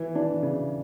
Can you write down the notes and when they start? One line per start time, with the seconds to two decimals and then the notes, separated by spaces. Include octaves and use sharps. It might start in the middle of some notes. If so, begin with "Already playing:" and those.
Already playing: E3
0.15 E3 D4
0.42 C#3